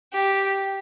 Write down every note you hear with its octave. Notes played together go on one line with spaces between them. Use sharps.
G4